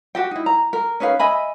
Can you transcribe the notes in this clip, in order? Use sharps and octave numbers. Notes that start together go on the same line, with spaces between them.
F#4 G4 G5
D#4 E4
A#5
A#4
C#4 D#4 B4 F5
D#5 E5 G#5 B5